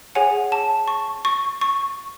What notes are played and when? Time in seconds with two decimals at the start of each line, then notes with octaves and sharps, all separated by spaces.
0.15 G#4 C#5 F#5 G#5
0.52 A5
0.88 C#6
1.25 C#6
1.61 C#6